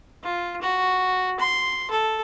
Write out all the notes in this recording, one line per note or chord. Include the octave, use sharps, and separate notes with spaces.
F4
F#4
C6
A4